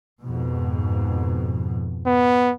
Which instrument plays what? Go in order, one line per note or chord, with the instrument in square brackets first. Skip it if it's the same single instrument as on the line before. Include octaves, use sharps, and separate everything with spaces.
[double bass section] F2 G#2 B2
[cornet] B3